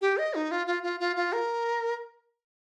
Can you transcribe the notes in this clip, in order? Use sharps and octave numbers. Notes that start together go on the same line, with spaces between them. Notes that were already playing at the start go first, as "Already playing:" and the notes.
G4
D#5
D#4
F4
F4
F4
F4
F4
A#4